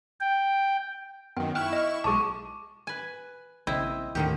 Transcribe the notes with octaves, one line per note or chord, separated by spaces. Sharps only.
G5
F#2 D#3 B3 G5
E4 G5 C#6 F6 F#6 E7
D#5 F6
B1 G#3 G#4 A5 C#6 D6
B4 G#5
A#1 C#3 C4 E4 D#5
D#2 A2 D3 D#3 G4